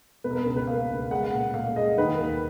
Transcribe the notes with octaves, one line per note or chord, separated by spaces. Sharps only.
B2 B4
A#4
B4
C#2 A#4
B4
A#3 F5
C#2
G#3 F#5
A#2
A#2 F5
G#3 D#5
D#3 B4
D#2